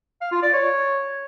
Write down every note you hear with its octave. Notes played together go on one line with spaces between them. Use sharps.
F5
F4
D5
C#5